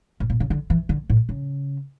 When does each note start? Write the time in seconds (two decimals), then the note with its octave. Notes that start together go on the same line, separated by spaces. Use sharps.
0.20 A2
0.30 A#2
0.40 C#3
0.50 D3
0.70 E3
0.89 D3
1.10 A2
1.29 C#3